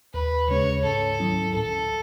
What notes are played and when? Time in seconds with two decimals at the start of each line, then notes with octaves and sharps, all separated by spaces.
0.14 D#2 B4
0.48 C#3 G#3 C#4 G#4 C#5
0.84 G#2 A4
1.19 D#3 F#3 C#4 E4
1.54 A2 A4